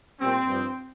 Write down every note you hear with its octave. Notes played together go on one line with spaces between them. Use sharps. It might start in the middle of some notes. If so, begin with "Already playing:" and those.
A#2 G3 C4
G2 F3